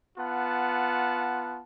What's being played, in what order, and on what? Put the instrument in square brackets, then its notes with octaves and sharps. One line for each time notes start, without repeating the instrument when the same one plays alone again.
[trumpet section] B3 F4 F#5 A5